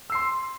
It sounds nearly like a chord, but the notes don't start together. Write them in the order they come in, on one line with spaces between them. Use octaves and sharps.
E6 C7 C6